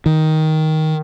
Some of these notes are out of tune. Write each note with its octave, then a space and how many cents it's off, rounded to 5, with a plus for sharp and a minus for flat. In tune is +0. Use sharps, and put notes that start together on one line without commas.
D#3 +10